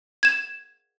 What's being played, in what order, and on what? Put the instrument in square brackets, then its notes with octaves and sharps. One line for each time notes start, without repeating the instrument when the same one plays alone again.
[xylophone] G#6 E7